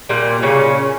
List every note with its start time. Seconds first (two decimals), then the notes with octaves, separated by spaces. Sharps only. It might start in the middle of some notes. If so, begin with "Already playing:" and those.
0.09 A#2 G3
0.42 A#2 C#3 C#4